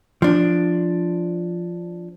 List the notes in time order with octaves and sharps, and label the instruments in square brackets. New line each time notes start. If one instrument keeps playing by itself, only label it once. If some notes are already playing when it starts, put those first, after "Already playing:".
[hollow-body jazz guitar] F3 D4